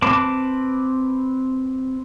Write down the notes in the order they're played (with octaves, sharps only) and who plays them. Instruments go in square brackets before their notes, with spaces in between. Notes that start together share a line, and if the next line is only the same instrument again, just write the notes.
[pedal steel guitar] C4 B4 A5 D6